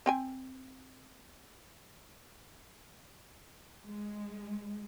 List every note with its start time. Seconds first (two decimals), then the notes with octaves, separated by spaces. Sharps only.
0.06 C4 G5 G#5
3.89 G#3